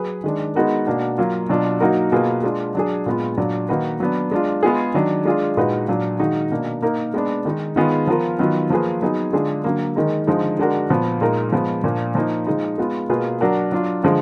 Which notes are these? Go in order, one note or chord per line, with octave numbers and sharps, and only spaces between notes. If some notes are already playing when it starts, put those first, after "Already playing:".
Already playing: F#3 G#4 B4
D#3 G#3 D4
G#3 B3 D#4 F#4 A#4
B2 A#3 D4 F#4
F#3 A#3 F4
B2 F#3 D4 F4
F#3 A#3 D#4 F#4 A#4
B2 A#3 F4 G#4 B4
G#3 D4 F4
F#3 D4 G#4
A#2 G#3 B3 F4
A#2 F#3 D4
D#3 A#3 D#4 F#4 B4
F#3 B3 D4
G#3 D4 F4
G#3 B3 F4 G#4
D#3 F#3 D4
G#3 D4 F4 G#4
A#2 G#3 D#4 F#4 B4
A#2 F#3 D4
D#3 G#3 D#4 F#4
B2 A#3 D4
A#3 D#4 A#4
G#3 B3 D4
D#3 G#3 D#4
D#3 G#3 B3 F4 G#4
F3 B3 F4 A#4
D#3 F#3 B3 F4
F3 A#3 F4 G#4 B4
F#3 B3 D#4 G#4
D3 G#3 D4 F4 G#4
D3 F#3 A#3
D#3 G#3 D#4 A#4
D3 F3 G#3 D#4
D3 G#3 D4 F#4 A#4
A#2 F3 B3
A#2 G#3 D#4 A#4
F3 G#3 B3
A#2 F3 A#3 D4
F3 A#3 D#4
F3 G#3 D#4
G#3 B3 F4
B2 A#3 F4 G#4 B4
F#3 D4 F#4 A#4
F#3 D4 F4
D3 F3 G#3